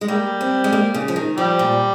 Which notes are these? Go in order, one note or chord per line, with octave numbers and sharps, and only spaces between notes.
G#3
G3 A#3
C4
G#3
A#3
C#3
F3
D#3
F3 G3
A#2